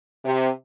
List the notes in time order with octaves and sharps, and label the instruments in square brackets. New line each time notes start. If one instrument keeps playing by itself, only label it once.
[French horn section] C3